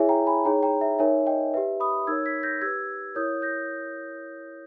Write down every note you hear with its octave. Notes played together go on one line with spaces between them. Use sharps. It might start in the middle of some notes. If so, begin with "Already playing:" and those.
Already playing: E4 G#4 C#5 E5 G#5
G5 A#5
G#5 B5
D#4 G#4 C#5 G5 A#5
G5 A#5
E5
D#4 A#4 C#5 E5 G#5
D#5 G5
G4 B4 E5
B5 D#6
D#4 A#4 C#5 E6 G#6
G#6 B6
G6 A#6
G4 B4 E6 G#6
E4 A#4 C#5 D#6 G6
G6 A#6